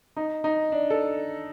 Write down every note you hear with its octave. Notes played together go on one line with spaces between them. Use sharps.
D#4
D#4
D4
A4